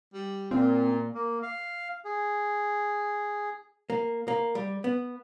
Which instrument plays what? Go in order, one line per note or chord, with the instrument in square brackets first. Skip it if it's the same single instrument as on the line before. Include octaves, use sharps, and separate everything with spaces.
[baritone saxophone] G3
[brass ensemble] A#2 [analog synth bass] C4 [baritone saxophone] F4
[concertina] A#3
F5
G#4
[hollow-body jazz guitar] A#3
A#3
G3
B3